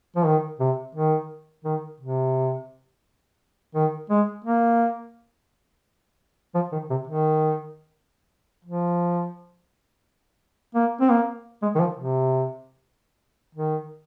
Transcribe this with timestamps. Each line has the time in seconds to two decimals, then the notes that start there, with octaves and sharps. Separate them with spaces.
0.16 F3
0.26 D#3
0.60 C3
0.95 D#3
1.65 D#3
2.00 C3
3.75 D#3
4.10 G#3
4.45 A#3
6.55 F3
6.72 D#3
6.90 C3
7.08 D#3
8.65 F3
10.75 A#3
11.01 C4
11.10 A#3
11.62 G#3
11.75 D#3
11.80 F3
11.97 C3
13.55 D#3